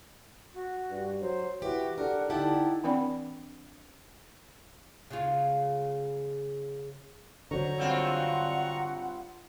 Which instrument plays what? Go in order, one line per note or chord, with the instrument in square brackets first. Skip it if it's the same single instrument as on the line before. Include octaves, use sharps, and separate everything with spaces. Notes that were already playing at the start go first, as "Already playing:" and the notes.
[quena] F#4
[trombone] G2
[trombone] F#3 [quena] C5
[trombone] E3 [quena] F#4 [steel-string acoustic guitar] G4
[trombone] D4 [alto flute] A4 [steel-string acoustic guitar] A#4 [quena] F#5
[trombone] D3 [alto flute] D#4 [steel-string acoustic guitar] E4 G4 F#5 [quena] A5
[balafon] E3 C4 D4 D5 F#5 B5
[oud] C#3 G#3 F4
[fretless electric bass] D3 F#3 [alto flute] C5 [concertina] A#5 C#6
[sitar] G2 C4 F4 [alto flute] F#5